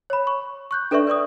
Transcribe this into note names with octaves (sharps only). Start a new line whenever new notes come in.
C#5 B5
C#6
C#6 F#6 G6
D4 A4 B4 D5 E5 C#6
B4 D5 C#6 D#6